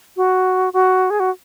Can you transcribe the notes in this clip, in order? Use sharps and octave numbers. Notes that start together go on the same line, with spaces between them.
F#4
F#4
G#4
F#4